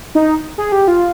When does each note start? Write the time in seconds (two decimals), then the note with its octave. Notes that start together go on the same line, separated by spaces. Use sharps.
0.15 D#4
0.58 G#4
0.72 G4
0.88 F4